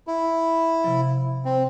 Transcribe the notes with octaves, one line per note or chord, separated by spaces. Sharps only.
E4
C3 F3
C4